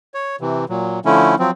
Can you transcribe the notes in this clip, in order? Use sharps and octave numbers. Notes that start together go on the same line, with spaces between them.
C#5
C3 E3
A#2 F#3
D3 F3 A3 C#4 E4
F3 F#3 C4